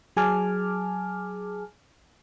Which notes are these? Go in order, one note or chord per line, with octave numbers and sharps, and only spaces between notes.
F#3 G#4 G#5 A5 D6 F6